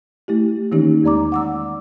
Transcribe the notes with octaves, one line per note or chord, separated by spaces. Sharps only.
A3 E4 G4
D#3 E3 A#3 C#4 D#4 G4
E2 G#3 D5 A#5 D6
F#5 D6 E6